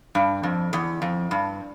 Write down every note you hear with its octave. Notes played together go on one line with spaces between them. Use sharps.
G2
F2
E2
F2
G2